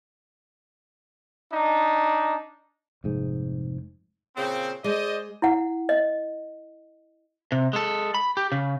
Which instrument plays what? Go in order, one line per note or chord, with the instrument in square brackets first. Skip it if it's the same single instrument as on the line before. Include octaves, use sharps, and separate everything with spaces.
[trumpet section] D4 D#4
[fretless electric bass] F1 G#2
[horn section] A#2 C#3 C4
[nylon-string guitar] G#3 [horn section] C5 D5 D#5
[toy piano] E4 F#5
D#5
[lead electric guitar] C3
G#3 A4
B5
G4
C#3